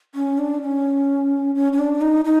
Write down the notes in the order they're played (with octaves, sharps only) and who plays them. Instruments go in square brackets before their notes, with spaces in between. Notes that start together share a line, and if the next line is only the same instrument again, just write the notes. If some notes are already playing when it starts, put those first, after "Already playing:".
[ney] C#4
D4
C#4
C#4
C#4
D4
D#4
D#4